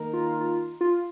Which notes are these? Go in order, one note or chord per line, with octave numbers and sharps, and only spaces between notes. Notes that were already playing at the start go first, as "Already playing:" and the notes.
Already playing: D#3 A#3 D#4 A#4
F4
F4
F4